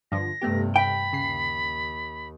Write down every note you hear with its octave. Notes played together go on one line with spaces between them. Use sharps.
G2 D3 F3 A#6
G2 C3 A3 B3 G4
G5 B5
D#2 C#3 C7